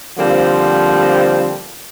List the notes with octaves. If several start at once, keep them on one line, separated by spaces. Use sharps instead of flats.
D3 F3 G3 A#3 C4